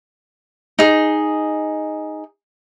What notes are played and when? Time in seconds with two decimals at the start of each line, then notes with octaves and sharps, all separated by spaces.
0.79 D#4 G#4